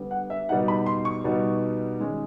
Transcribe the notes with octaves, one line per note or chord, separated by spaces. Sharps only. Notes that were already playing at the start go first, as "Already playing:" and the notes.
Already playing: D3 G3 B3
F#5
E5
B2 G3 B3 D#4 F#5
B5
C6
C#6
B2 G3 B3 D#4
D#3 G#3 C#4